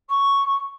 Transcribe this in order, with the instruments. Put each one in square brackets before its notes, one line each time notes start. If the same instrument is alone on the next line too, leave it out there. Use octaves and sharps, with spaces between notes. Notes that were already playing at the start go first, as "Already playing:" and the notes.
[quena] C#6